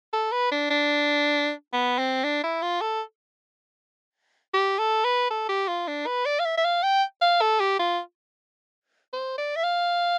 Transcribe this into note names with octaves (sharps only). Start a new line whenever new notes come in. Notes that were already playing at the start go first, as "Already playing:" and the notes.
A4
B4
D4
D4
B3
C4
D4
E4
F4
A4
G4
A4
B4
A4
G4
F4
D4
B4
D5
F5
E5
E5
F5
G5
F5
A4
G4
F4
C5
D5
E5
F5